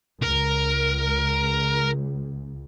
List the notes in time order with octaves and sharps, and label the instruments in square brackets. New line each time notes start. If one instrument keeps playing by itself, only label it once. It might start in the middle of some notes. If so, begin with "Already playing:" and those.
[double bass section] C#2 [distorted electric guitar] A#4